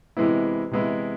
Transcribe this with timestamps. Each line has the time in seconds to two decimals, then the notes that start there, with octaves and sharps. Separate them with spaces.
0.17 C3 E3 G#3 B3 E4
0.71 C3 E3 G#3 B3 E4